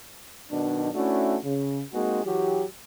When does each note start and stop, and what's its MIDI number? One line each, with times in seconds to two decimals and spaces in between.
0.50 0.89 35
0.50 0.89 47
0.50 0.89 51
0.50 0.89 62
0.93 1.37 57
0.93 1.37 61
0.93 1.37 62
0.93 1.37 64
0.93 1.37 66
1.44 1.82 49
1.93 2.25 56
1.93 2.25 58
1.93 2.25 60
1.93 2.25 63
1.93 2.25 66
1.93 2.25 68
2.25 2.63 52
2.25 2.63 54
2.25 2.63 66
2.25 2.63 67